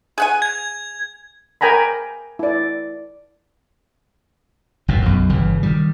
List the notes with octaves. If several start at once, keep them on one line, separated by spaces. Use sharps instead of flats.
G#4 F#5 G#5
G#6
A#4 G5 G#5 A#5 B5
E4 D5
G1 F2 A#2
B1 F#2
G1 C#3 E3
D#3 E3 G3